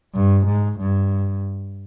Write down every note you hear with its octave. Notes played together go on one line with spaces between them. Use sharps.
G2
G#2
G2